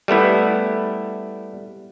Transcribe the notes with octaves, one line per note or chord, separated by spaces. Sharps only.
G3 A3 B3 E4